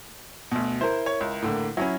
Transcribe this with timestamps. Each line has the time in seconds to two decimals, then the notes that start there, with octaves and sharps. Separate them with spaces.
0.52 D2 B2
0.81 E4 A#4 C5
1.06 C#5
1.21 C#2
1.42 A2 D3 A#3
1.77 F#3 C#4 E4 B5